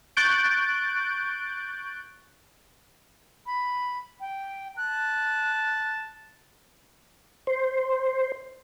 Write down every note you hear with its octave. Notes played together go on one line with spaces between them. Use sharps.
C#6 F#6 G6 A6 D7
B5
G5
A5 F#6
C5